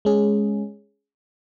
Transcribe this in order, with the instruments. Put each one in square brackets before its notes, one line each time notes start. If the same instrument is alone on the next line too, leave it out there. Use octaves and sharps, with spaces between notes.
[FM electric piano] G#3 C#4 G#4